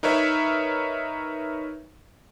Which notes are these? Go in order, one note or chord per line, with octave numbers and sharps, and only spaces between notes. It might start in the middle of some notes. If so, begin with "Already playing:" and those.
D#4 A#4 B4 C#5 E5